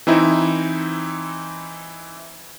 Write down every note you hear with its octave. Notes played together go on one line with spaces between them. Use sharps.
E3 C4 D#4 E4